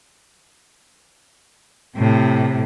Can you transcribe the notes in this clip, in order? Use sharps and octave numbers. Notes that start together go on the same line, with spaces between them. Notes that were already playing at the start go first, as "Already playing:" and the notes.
A2 C3